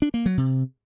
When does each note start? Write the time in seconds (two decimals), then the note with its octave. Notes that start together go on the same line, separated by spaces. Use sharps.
0.02 D4
0.14 A#3
0.26 F#3
0.38 C3